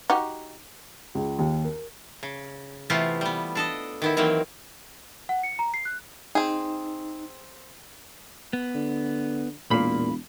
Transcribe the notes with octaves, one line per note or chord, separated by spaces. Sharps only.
D#4 F#4 G4
C#2
D#2
A#4
C#3
C3 E3 A3 B3 F4
G3 B3
D4 A4 D#5
D#3 B3 E4
D#3 E3 F#3 A#3 C4
F#5
C#7
A#5
C7
F#6
C4 D#4 G#4
B3
D3
E1 A#2 A#3 B5